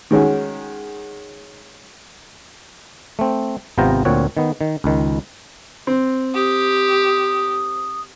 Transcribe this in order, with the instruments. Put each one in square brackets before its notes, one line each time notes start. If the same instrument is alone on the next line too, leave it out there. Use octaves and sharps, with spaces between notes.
[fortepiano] D#3 G#3 C#4 F#4
[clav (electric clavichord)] A3 C4
G#1 C3 B3 F4 G5 A#5
D2 A#2 C4 C#5 F#5
D#3 B3
D#3
C#2 D#3
[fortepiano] C4
[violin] G4 [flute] D#6